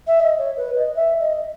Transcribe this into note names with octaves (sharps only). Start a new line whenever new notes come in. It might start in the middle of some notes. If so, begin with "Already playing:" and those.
E5
D#5
C#5
B4
D#5
E5
D#5